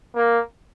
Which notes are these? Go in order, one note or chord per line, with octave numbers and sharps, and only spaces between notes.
A#3